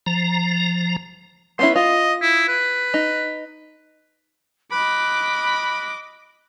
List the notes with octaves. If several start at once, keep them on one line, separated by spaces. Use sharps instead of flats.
F3 A#5
B3 C#4 E4 C6
F4 D#5
E4
B4
D#4
D#5 B5 D6 F#6